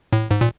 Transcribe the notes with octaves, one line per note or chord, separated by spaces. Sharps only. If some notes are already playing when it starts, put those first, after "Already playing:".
A2
G#2
A#2